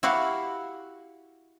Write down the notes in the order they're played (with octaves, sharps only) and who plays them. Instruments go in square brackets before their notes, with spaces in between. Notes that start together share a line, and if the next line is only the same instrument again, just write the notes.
[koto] E4 F#4 G4 F5 F#5